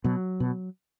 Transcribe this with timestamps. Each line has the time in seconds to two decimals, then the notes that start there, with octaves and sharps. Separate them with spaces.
0.04 B2 F#3
0.40 B2